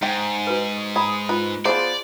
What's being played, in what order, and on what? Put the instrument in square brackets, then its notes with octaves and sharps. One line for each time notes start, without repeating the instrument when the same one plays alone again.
[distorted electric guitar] G#2 [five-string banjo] G5
[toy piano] F#4 B4
C#6
[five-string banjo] G#4 [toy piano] A#5 B5 D#6
[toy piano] F4 [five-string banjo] B4
[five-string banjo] F3 B3 C5 [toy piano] G#4 D#5 [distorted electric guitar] D5